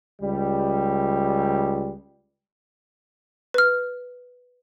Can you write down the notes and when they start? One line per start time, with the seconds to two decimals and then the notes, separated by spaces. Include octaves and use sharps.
0.21 C#2 G3
3.54 B4 F6